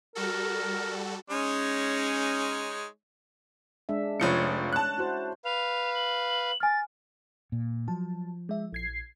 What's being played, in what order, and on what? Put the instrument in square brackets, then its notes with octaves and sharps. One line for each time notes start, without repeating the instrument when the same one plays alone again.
[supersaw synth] G3 F#4 A4 [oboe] A#4
[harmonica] G#3 D#4 C#5 [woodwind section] C#4
[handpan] G#3 D4 E5
[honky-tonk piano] F1 F3 C#7 [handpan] C#4 C#5
[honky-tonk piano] A5 F#6
[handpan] E4 F#4 C5
[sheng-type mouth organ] B4 F5 [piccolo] F7
[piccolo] F#7
[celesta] G#5 F6 [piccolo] A6
[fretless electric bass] A#2
[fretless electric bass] F3 [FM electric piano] F#3 A5
[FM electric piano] G#3 E5
A#1 G#6 C7